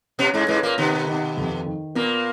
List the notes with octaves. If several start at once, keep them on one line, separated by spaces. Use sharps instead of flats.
B2 B3 C#4
G#2 G#3
G#2 G#3 B4
A#2 A#3
B2 D#3 B3
D#3
F2
D#3
A#2 A#3 B3